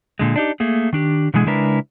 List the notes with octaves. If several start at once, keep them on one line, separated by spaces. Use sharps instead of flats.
A#2 D3 G#3
D4 D#4 G4
A3 A#3 G#4
D#3 D4 G4
B2 D3 E3 G#3 G#4
C#3 G#3 D4 E4 A#4 B4